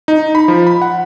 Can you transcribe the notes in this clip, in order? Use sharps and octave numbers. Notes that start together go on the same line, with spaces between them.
D#4
B5
F3
B5
F#5